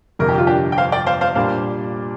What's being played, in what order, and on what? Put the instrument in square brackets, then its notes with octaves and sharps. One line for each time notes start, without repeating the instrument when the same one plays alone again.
[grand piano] G1 F2 C3 [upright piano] A#4
[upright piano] G4
F4
D4 G4
G5
C5 F5
D5 G5
C5 F5
C5 F5
[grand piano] A#2 G3 D4 [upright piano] C5 F5